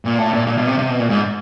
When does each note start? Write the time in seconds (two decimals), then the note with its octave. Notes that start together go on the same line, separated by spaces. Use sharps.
0.05 A#2
0.18 A2
0.33 A#2
0.47 A#2
0.58 B2
0.67 C3
0.79 C3
0.89 B2
1.00 A#2
1.10 G#2